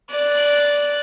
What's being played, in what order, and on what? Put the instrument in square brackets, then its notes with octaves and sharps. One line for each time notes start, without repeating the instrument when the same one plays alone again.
[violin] D5 F#6